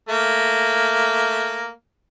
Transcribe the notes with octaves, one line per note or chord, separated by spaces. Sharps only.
A3 A#3